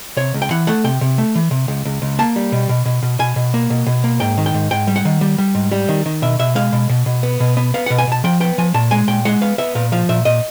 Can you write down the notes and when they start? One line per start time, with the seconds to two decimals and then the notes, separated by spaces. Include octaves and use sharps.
0.17 C3 C#5
0.34 C#2
0.42 G5
0.51 E3 F#5
0.67 A3 F#5
0.84 C3 G5
1.01 C3
1.18 A3
1.35 E3
1.51 C3
1.68 C#2
1.85 C#2
2.02 C#2
2.19 A#3 A5
2.36 G3
2.52 B2
2.69 B2
2.85 B2
3.03 B2
3.19 B2 G#5
3.36 B2
3.54 A#3
3.70 B2
3.87 B2
4.04 A#3
4.20 G#2 G5
4.38 D#3
4.46 G5
4.54 G#2
4.71 G#2 G5
4.87 G3
4.96 F#5
5.05 D#3
5.21 G3
5.38 G3
5.55 G#2
5.71 G3
5.89 D#3
6.06 D#3
6.22 B2 E5
6.39 B2 E5
6.55 G#3 F5
6.73 B2
6.89 B2
7.06 B2
7.23 B3
7.40 B2
7.57 B3
7.74 B3 F5
7.86 B2 F#5
7.98 G#5
8.07 B2 A5
8.24 F3 G5
8.40 B3 G5
8.58 F3 G#5
8.74 A#2 A5
8.91 G#3 G#5
9.08 A#2 G5
9.25 G#3 F#5
9.41 B3 F5
9.58 B3 E5
9.75 A#2 F5
9.92 F3 F5
10.09 A#2 E5
10.25 A#2 D#5